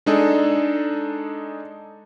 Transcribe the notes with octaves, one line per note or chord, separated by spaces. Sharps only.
G#3 D4 D#4 G#4 A4